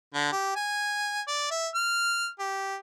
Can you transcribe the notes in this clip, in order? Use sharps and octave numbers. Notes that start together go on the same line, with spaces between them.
D3
G4
G#5
D5
E5
F6
G4